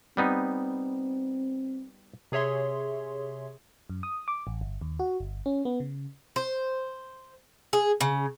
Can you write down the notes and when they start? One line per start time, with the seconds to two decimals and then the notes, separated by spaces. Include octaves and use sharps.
0.17 G3 B3 C4 D#4
2.32 C3 G#4 C#5 E5 C6
3.90 F#2
4.03 D#6
4.28 D6
4.47 A1
4.61 G1
4.81 D#2
4.99 F#4
5.20 G1
5.46 C#4
5.65 B3
5.80 C#3
6.36 C5
7.73 G#4
8.01 C#3